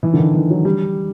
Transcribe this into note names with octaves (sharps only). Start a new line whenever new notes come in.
E3
D3
D#3
E3
F#3
G3